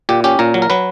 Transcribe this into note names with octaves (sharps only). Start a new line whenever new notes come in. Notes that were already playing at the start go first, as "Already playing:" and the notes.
A#2 G4
C#4 G4
A#2 A#4
F#3
A#4
F#3 B4